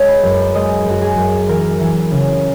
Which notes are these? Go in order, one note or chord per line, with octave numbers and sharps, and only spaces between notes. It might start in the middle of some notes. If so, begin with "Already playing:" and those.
Already playing: G#3 C#5 D#5
B4
F#2
G#3 D#5
F#2 F#4
G#4
F#2
E3 A#4
E3
C#3